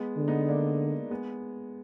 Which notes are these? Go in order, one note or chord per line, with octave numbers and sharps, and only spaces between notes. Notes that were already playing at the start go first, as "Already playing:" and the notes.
Already playing: G#3 B3
D3
B3 D#4
A#3 D4
G#3 B3